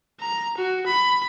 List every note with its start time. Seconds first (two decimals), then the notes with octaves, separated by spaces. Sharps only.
0.20 A#5
0.57 F#4
0.86 B5